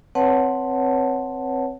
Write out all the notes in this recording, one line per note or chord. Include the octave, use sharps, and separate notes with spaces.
C4 B4 C#5 F#5 A5